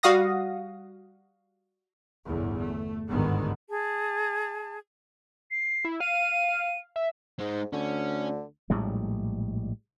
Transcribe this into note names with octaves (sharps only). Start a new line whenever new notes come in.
G3 F#4 F5 F#5 D#6 A#6
G1 E2 A2
A3
G1 D2 G#2 D3 D#3 B3
G#4 A5
C7
E4
F5 D#7
E5
G#2 G#3 D#4
D2 D3 C#4
A#1 A2 G3 G#3